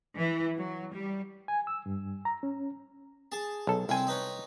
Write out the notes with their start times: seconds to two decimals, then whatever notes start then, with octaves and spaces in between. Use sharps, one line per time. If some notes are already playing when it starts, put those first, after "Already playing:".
0.17 E3
0.56 F#3
0.92 G3
1.48 G#5
1.67 E6
1.86 G2
2.25 A#5
2.43 C#4
3.32 G#4 A5
3.67 B1 A4
3.89 C2 C4 E4 G#5
4.07 D#4 B4 C#5